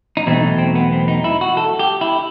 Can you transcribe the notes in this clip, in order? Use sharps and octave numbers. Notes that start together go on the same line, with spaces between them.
D#4
E2 B2 F#3 A3 C4
D#4
C4
B3
C4
D#4
E4
F#4
A4
G4
E4